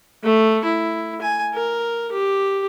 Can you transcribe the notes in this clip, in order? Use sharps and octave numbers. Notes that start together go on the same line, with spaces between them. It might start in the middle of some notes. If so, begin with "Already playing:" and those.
A3
E4
G#5
A#4
G4